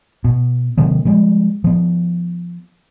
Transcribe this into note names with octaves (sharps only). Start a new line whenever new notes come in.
B2
C3 D#3 F#3 A#3
F3 G3 G#3
F3 B3